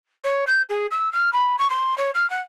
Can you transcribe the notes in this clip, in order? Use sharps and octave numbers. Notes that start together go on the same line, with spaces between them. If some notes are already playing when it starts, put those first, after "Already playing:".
C#5
G6
G#4
E6
F6
B5
C#6
C6
C#5
F6
F#5